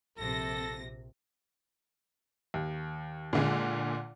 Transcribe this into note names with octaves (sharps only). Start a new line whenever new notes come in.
A#1 C3 A4 A#6
D#2
A#2 D3 G#3